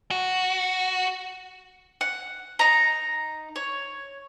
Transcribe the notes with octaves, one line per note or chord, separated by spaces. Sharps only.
F#4
F#5
D#4 A#5
C#5